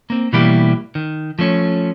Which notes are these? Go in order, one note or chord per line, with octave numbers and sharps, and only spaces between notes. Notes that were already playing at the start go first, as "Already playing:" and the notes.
A#3 C4
B2 E3 G3 A#3 E4 G4
D#3
F3 A3 C#4